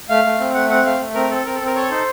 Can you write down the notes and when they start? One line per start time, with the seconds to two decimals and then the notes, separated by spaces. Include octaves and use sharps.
0.09 A3 F5
0.24 A3
0.39 C4
0.54 A3 F#5
0.69 C4 F#5
0.85 A3 F5
0.99 A3
1.14 C4 A#4
1.30 C4 A4
1.45 C4 A#4
1.55 A4
1.61 C4
1.66 A#4
1.75 A4 C#5
1.90 D#4 C5